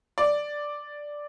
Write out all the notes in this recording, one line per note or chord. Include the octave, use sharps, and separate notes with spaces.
D5